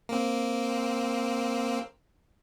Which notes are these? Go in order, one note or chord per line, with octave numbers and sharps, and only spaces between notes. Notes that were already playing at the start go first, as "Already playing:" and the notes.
A#3 C4